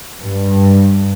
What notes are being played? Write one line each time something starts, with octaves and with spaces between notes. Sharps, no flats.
G2